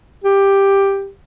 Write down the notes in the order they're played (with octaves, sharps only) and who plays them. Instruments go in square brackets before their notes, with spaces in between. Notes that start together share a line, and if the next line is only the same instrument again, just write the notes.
[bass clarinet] G4